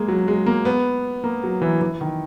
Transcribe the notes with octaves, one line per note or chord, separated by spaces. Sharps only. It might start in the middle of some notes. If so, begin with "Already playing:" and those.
Already playing: G#3 A#3
F#3
G#3
A#3
B3
A#3
F#3
E3
E3
D#3